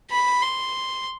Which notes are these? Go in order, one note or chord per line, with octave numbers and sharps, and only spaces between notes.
B5
C6